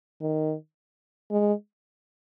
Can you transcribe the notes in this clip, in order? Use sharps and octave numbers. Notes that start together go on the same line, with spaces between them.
D#3
G#3